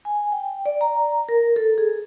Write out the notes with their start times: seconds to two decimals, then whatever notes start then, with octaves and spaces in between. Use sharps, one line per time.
0.05 G#5
0.32 G5
0.66 D5
0.81 A#5
1.29 A#4
1.56 A4
1.78 G#4